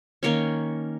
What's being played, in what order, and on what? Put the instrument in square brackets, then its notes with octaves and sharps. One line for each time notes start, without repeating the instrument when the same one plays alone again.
[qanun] D#3 A#3 C#4 C#5